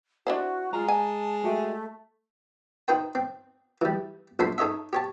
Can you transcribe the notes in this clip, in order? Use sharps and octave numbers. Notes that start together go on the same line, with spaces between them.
D4 E4 F#4 C5
G#3 F4 A#5
G#5 A5
A3 F#4 G4 E5
D#4 B4 C5 G5
C4
E3 G3
A#1 A4 C5 B5 C6
D#4 A4 C#5 D#5 E5
G4 C#5 A5